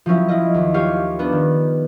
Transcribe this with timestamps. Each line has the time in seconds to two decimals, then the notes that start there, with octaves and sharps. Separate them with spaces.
0.06 F3 F#3 C#4 E4
0.28 E4 F4 D#5
0.54 D#2
0.74 F4 G4 C5 C#5 F5
1.19 B3 D4
1.32 D#3